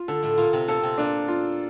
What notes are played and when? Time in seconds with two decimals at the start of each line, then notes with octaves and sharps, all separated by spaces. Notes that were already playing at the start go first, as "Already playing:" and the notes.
Already playing: F4
0.08 D3 A4
0.23 A2 A3
0.38 A#2 A#3 F4
0.53 C3 C4
0.68 A#2 A#3 A4
0.83 C3 C4
0.98 A#2 A#3 D4
1.28 F4